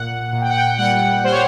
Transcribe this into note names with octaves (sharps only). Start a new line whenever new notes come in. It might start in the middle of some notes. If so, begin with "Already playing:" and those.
Already playing: A#2 F#5
A#2
G5
F#5
G5
G3 F#5
G3 C5
C#5